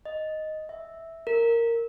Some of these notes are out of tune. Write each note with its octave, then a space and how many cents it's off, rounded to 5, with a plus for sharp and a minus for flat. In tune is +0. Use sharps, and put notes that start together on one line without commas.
D#5 +0
E5 -5
A#4 -10